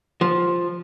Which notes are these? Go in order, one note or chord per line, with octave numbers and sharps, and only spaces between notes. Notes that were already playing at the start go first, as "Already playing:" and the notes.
F3